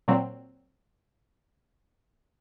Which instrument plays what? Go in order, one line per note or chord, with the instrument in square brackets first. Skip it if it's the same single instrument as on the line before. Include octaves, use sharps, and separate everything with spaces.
[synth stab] A#2 F#3 C4